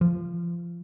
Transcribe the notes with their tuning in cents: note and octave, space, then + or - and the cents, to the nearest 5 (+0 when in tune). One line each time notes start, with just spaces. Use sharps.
F3 -20